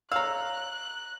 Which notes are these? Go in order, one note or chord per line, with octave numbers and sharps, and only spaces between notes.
C#5 F5 A#5 E6 F#6